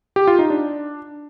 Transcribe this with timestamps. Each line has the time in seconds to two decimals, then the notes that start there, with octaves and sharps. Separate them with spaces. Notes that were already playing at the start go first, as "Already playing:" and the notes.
0.16 G4
0.27 F4
0.39 D#4
0.50 D4